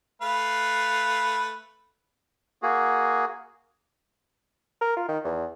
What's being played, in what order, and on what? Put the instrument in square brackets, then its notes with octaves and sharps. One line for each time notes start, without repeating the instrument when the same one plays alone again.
[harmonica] A3 B4 F5
[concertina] A#3 F#4 G#4
[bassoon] A#4
F4
D#3
E2